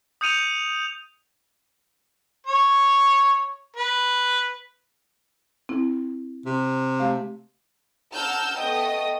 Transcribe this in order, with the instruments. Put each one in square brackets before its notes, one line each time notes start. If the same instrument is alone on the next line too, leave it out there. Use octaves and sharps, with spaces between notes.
[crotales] D#6 G6 C#7 D#7 F7
[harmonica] C#5
B4
[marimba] C4 E4
[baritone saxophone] C3
[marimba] A3 G4 F5
[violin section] F#5 A5 A#5 E6 F6 G6
A3 B3 D#5 G5 D#6